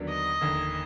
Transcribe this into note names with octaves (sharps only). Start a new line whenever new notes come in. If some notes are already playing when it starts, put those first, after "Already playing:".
Already playing: D#2 D3 F#3 B3 D4
D#5
F1 D#2 D3